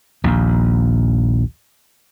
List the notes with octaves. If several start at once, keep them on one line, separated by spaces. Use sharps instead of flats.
A#1 D#2